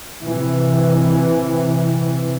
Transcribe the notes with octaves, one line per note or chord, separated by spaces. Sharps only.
C3 E3